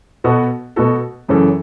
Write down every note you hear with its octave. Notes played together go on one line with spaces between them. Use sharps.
B2 B3 F#4 A4
B2 B3 F#4 A4
F#2 C#3 E3 C#4 A4